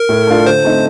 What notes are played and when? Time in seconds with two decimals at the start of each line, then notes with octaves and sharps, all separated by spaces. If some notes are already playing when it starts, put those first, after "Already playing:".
Already playing: A#4
0.09 A2
0.27 A3 D4 F4
0.46 D3 C5
0.64 A3 C4 D#4